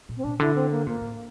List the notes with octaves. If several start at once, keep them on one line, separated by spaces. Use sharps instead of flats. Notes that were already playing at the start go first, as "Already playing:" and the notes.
A#2
C4
A#2 D4
D3 E4
C4
A#3
A#2 A#3
A2